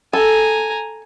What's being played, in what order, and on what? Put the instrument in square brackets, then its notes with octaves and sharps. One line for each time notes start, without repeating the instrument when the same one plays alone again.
[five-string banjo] A4 [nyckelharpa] G#5 A#5